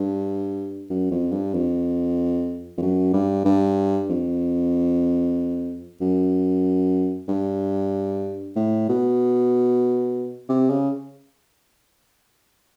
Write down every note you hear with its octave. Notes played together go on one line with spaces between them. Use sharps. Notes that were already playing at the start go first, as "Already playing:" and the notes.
Already playing: G2
F#2
F2
G2
F2
F2
F#2
G2
G2
F2
F#2
G2
A2
B2
C3
C#3